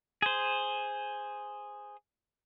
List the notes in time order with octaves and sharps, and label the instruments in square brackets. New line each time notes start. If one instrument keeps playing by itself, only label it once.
[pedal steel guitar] G#4 C5